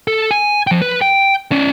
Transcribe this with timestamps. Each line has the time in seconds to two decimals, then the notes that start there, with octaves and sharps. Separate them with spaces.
0.08 A4
0.31 G#5
0.67 F3 G5
0.81 B4
1.01 G5
1.52 C#4 D5